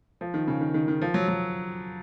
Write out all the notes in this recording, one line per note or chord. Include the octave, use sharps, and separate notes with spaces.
F3
D#3
C#3
D#3
D#3
D#3
F3
F#3
F#3